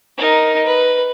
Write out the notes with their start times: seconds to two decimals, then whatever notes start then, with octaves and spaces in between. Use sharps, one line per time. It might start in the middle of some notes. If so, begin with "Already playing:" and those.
0.17 D#4 A#4
0.65 B4